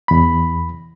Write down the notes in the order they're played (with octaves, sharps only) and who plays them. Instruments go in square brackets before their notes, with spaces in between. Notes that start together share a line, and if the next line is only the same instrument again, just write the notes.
[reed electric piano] E2 B5